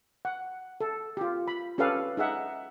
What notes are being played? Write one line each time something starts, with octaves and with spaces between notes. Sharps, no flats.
F#5
A4
F4 G4
B5
C#4 G4 A4 B4 F5
D#4 G#4 E5 F#5